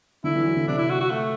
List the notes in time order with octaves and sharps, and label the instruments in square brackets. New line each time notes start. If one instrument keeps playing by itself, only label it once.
[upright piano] D3 [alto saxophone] E4
[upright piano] E3
F#3
D3
[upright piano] C3 [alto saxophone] D4
[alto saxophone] E4
F#4
F#4
A3